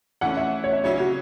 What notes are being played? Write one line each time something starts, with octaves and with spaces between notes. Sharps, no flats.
E3 A3 C#4 F#5
E5
C#5
E5
C#3 F#3 C#4 E4 C#5
F#4